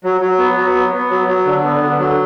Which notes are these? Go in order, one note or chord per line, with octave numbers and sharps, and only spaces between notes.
F#3
F#3
B3
F#3
B3
B3
F#3
F#3
D3
B3
D3
F#3